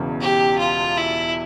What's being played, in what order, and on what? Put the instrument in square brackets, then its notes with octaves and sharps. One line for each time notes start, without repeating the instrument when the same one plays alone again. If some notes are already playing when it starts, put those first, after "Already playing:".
Already playing: [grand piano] E1 E2 C#3
[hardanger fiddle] G4
F4
E4